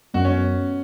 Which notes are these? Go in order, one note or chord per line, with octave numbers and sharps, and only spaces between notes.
F#2 F#4
C#4
B3